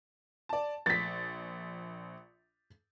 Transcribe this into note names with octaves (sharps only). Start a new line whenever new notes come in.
D5 A5
A#1 A6 B6